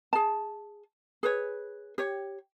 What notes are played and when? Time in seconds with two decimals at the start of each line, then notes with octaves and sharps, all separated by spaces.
0.13 G#4 A5
1.23 G#4 B4 C#5
1.98 G4 C#5